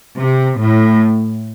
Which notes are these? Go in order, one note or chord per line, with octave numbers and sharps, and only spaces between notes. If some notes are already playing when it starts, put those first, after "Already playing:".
C3
A2